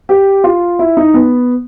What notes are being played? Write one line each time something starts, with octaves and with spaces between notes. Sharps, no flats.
G4
F4
E4
D#4
B3